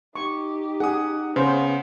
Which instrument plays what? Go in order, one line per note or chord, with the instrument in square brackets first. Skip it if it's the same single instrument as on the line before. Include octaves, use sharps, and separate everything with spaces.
[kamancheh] D#4 G4 [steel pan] C#6
[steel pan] G#4 [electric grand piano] F#5 D#6
[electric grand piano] C#3 [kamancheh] B3 [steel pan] C5